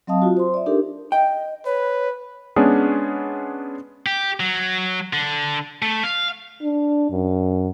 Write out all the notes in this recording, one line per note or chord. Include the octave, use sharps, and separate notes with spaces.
F#3 C4 D#5 F5 A5 D#6
F4 F#4
C5 C6
D5 E5
D4 D#4 G4 A4 A#4
D#5 G5
B4 C#5
G#3 B3 C#4 D4 G#4
G4
F#3
D3
A3
F5
D4
F#2